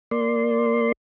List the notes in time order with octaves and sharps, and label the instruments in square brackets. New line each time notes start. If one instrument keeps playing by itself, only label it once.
[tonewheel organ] A#3 D5 C6